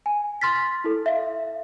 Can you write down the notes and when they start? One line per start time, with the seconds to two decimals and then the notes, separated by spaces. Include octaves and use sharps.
0.06 G#5
0.41 C6 F6 A6 B6
0.84 E4 A4
1.06 E5 F5